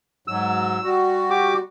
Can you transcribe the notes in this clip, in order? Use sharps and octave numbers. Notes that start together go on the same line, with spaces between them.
G#2 F#3 E6
G3 F#4
G4 D6